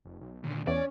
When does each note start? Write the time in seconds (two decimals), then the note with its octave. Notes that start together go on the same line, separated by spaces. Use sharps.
0.05 F1
0.21 B1
0.44 D#2 A#2 D3
0.67 E2 C#4 C#5 D5